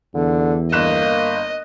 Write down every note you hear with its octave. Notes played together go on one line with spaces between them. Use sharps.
E2 D3
G1 A#3 D#5 F#6 E7